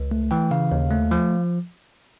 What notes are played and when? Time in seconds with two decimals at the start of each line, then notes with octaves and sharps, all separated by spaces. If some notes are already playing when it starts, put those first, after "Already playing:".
Already playing: C#2
0.11 A3
0.31 E3 G5
0.51 C#3 F5
0.72 D#2
0.90 A3
1.11 F3